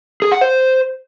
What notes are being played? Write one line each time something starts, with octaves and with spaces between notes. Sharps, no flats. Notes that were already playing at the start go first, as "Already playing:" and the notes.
G#4
F#5
C5